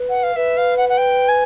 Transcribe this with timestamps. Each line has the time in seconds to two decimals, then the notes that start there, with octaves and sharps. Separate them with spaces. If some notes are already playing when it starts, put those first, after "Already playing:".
Already playing: B4
0.09 F#5
0.23 F5
0.36 B4 E5
0.57 F5
0.77 F#5
0.89 F#5
0.97 G5
1.28 G#5